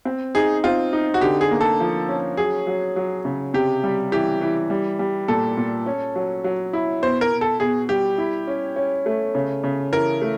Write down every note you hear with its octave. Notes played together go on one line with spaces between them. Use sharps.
C4
D#4 G#4
C4 F4
D#4
F#4
D3 G4
G#4
A#3
A4
F3
C#4
F#3 G#4
F#3
F#3
C#3
C3 G4
G3
E3 G4
E3
G3
G3
A#2 A4
A#2
C#4
F#3
F#3
E4
B2 C5
A#4
B2
A4
B2 G#4
G3 G4
E4
C#4
C#4
A3
C#3
C#3
E3 A#4
A3